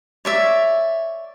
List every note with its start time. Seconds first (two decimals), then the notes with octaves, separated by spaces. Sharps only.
0.25 C#5 D5 E5